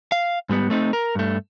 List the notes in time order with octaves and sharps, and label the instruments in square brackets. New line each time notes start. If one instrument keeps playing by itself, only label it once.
[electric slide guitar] F5
G#2 G3 B3
A3 C4 D#4
A#4
G2 A3